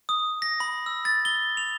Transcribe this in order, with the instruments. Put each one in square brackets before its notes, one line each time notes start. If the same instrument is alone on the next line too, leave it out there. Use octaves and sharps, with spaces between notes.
[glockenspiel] D#6
A#6
B5
E6
A6
G7
F7